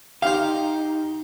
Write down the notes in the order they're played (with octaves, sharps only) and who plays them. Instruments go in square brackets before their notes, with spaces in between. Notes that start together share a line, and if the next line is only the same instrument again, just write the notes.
[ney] D#4 [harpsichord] G4 C5 [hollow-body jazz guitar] F5